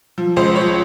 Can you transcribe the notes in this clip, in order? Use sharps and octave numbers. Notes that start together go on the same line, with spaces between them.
F3
C#2 C5
F3 C#5